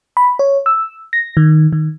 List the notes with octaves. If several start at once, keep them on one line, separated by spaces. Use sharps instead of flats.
B5
C#5
E6
A#6
D#3
D#3